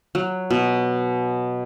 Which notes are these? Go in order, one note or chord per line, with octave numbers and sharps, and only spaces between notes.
F#3
B2